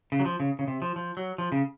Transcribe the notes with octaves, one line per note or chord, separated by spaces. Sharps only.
C#3
F#3
F3
C#3
C#3
C3
F3
F3
F#3
F3
C#3